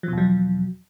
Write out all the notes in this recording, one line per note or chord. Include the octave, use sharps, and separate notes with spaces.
E2 B2 F3 F#3